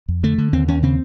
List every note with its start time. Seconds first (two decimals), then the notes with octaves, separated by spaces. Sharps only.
0.08 F2
0.23 D3 A3
0.38 D3
0.53 D#2 C4
0.68 D#2 C#4
0.83 C#3 C4